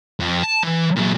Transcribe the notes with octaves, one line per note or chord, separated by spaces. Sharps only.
F2
A5
E3
A#2 F#3